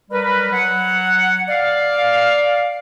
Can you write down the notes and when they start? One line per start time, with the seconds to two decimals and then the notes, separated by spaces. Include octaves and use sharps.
0.11 F#3 G3 A#4 B4
0.51 F#3 F#5
1.49 D5 F5